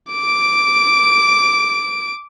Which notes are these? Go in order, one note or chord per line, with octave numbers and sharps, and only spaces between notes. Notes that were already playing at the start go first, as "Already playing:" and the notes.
D6 D7